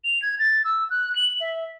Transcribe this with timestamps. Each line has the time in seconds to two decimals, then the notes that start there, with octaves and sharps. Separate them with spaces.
0.04 F7
0.22 G#6
0.39 A6
0.65 E6
0.90 F#6
1.16 F#7
1.40 E5